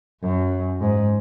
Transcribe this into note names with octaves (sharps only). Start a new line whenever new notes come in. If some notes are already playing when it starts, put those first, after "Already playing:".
F#2
G#2